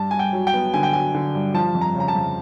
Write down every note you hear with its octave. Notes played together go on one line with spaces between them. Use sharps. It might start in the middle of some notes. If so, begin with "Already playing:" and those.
Already playing: G2 A5
G2 G#5
G5
F#3
G5
B3
D3 G#5
G5
F#3 G#5
D3
G2
F3 A5
F2
A#5
C#3 A#5
A5
F2